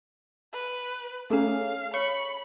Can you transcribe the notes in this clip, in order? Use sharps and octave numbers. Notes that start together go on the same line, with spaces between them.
B4
A3 C#4 G#4 A4 F5 A#5
C#5 B5 C#6 C#7